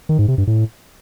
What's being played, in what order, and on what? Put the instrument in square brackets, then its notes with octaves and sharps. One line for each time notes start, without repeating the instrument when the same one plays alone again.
[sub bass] D#3
G#2
C3
G2
A2